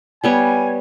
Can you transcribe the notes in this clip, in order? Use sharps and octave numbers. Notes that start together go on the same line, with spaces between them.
G3 B3 C#5 G#5